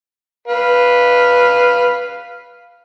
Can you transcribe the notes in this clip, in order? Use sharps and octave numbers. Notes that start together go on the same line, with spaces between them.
B4 F5